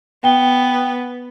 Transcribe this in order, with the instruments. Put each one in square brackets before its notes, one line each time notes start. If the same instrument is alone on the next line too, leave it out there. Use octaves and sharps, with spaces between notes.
[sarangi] B3 [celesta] G5 G7